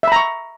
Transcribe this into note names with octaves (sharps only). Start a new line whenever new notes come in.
E5 A#5 B5 C#6